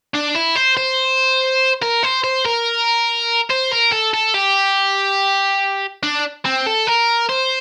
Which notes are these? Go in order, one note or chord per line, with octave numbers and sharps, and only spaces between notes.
D4
E4
C5
C5
A#4
C5
C5
A#4
C5
A#4
A4
A4
G4
D4
C4
A4
A#4
C5